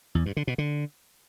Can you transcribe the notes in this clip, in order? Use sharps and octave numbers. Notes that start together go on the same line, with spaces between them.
E2
G2
D3
B2
D3